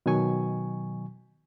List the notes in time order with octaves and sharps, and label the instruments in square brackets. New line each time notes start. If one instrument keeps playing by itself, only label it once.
[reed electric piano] B2 D#3 F#3 G#5 C#6